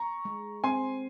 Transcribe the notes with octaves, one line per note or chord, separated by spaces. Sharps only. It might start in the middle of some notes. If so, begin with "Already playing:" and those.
Already playing: A#5 C#6
G#3
C4 G#5 C6